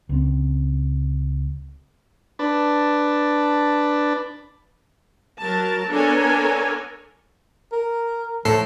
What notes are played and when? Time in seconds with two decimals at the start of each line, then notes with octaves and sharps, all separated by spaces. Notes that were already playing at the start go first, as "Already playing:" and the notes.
0.09 C#2 C4
2.39 D4 B4 A5
5.39 F#3 A#4 A5
5.90 B3 D4 A4 A#4 C#5 G#5
7.72 A#4
8.45 A2 F3 A4 C7